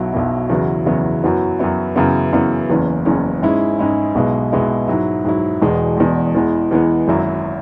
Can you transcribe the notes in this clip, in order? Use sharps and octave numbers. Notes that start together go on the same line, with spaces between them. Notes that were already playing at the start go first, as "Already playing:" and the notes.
Already playing: B1 B2 F#3 E4
B1 B2 F#3 E4
E2 C#3 F#3 B3 E4
E2 C#3 F#3 B3 E4
F#2 F#3 B3 E4
F#2 F#3 B3 E4
F#2 C#3 E3 B3 E4
F#2 C#3 E3 B3 E4
F#1 E2 E3 C#4
F#1 E2 E3 C#4
G#2 G#3 C#4 E4
G#2 G#3 C#4 E4
B1 B2 G#3 B3 E4
B1 B2 G#3 B3 E4
G#2 F#3 E4
G#2 F#3 E4
E1 E2 B2 G#3
E1 E2 B2 G#3
E2 E3 G#3 B3
E2 E3 G#3 B3
G#1 F#2 F#3 E4